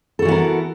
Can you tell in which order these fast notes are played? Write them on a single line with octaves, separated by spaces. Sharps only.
A4 F#4 E3 B3 A#4